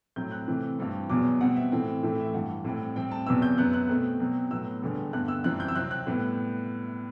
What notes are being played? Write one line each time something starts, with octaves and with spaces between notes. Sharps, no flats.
A2 F#3 C4 G6
F#6
C3 E3 A3 C4
G2 E3 G3 C4
E2 B2 F#3 D6
B2 G3 C4 F#5
E5
A2 E3 A3 C4
A2 E3 A3 C4
E5
G2 E3 G3 F#5
A2 G3 C4
A2 G3 C4 G5
A5
E2 C3 F#3 B3 E6
G6
F#2 F#3 B3 F#6
F#6
B2 A3 C4
B2 F#3 C4
A2 F#3 B3 E6
E2 D3 G3 B3
G2 D3 G3 B3 F#6
E6
F#2 E3 G3 C4 F#6
G6
E6
C3 F#3 C4 F#6
F#6
A2 G3 B3